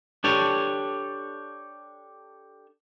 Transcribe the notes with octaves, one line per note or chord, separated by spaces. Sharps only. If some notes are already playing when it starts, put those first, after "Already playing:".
D4 G4 A4 C#5